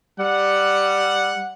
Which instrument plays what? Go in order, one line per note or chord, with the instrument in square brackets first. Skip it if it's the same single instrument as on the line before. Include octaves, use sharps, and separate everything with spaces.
[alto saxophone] G3 [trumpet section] F#5